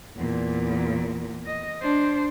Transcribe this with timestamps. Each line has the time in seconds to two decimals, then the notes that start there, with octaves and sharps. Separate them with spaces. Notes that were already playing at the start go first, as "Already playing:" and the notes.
0.16 E2 A#2
1.46 D#5
1.82 D4 C5